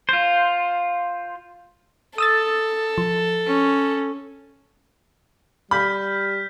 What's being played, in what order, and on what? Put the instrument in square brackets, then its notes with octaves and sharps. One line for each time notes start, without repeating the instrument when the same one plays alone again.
[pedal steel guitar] F4 C5
[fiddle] A4 [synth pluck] D#6 E6 A6
[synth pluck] F3
[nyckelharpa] C#4
[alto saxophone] G3 [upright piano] B5 [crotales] F6 G6 B6